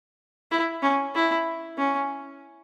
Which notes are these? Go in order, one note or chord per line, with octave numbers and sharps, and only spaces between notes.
E4
C#4
E4
C#4